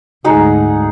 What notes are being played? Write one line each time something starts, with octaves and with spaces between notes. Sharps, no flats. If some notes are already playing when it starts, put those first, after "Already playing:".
D2 G#2 D#4 G#4 F#5